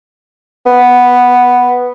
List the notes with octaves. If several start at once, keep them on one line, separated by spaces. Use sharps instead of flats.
B3